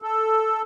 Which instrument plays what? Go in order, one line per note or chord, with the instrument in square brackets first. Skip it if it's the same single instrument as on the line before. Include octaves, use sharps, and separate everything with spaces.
[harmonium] A4